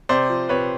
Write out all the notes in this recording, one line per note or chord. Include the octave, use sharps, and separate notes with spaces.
C3 C5 D5
F3
C3 B4 C#5